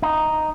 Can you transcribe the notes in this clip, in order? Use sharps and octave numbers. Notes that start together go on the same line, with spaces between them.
D#4